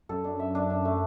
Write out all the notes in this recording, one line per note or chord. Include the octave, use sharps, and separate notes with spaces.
F#2 A4
D4
E5
D4
D4
A3